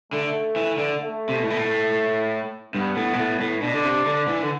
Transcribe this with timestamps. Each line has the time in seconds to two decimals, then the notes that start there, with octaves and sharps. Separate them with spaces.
0.12 D3 A3
0.56 E3
0.78 D3
1.00 A3
1.29 C3
1.36 B2
1.43 A2
1.50 B2
1.58 A2
2.75 G2 B3
2.96 A2
3.13 B2
3.19 A2
3.40 A2
3.62 B2 D4
3.74 D3
3.84 C3
4.06 D3
4.28 E3
4.42 D3